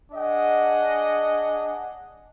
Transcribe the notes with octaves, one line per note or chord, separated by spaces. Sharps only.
D4 G#4 D#5 F#5